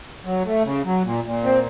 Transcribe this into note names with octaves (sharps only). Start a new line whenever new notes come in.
F#3
A3
C#3
F#3
A#2
A#2
C4